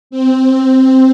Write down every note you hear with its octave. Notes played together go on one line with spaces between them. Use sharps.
C4